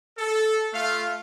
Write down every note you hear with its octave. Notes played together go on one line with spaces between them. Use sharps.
A4
A3 F4 F5